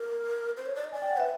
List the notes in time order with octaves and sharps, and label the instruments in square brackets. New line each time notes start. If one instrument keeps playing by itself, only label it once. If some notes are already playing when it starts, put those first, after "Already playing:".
Already playing: [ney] A#4
C5
C#5
D5
D#5
[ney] D5 [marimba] G#5
[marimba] G5
F#5
[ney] B4 [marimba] E5